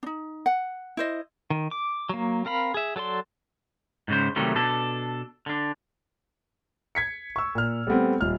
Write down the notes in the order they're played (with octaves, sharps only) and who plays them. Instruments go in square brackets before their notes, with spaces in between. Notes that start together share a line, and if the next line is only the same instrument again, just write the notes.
[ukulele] D4 D#4
F#5
E4 C5 D#5
[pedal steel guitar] D#3
D6
F#3 A#3
C4 A#4 F5 B5
G#4 E5
F#3 A4 D5 C6
[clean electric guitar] G#2 C#3 C5
C3 D#3 F#3 G3 A3
B2 D4 A4
D3 D4
[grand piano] G#6 B6 C#7
C#6 E6
A#2 F6
G3 A3 B3 C4
D#1 F6